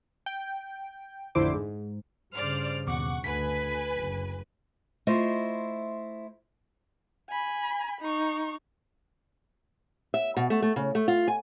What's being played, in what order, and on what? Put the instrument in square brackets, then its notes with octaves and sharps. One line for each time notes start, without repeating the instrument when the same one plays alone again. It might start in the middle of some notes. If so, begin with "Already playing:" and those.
[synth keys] G5
A1 F2 D3 E4 C5 D6
G#2
[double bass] G2 C#3 [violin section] C5 D5 F6
[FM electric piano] D#2 B2 D6 [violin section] F#5 C#6
[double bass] D2 [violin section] B4 G#5 [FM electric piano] B6
[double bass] F#1
[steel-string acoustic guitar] A3 E4 F4 C5 D#5 E5
[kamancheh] G#5 B5
D#4 C#6
[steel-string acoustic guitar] E5
B2
A3
A3
C#3
A3
F4
G#5